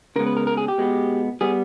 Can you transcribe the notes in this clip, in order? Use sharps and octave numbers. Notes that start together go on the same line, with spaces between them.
C#3 G#3 B3 A#4
B4
A#4
A#4
G#4
G4
B2 G#3 B3
G3 B3 G#4